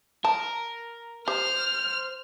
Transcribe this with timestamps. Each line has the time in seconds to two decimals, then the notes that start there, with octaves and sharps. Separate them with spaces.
0.24 A#4 A5
1.28 G4 C5 F6